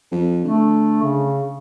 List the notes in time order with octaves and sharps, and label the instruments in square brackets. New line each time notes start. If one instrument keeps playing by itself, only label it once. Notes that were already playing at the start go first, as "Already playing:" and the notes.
[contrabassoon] F2
[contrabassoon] D3 [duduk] A3
[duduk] C#3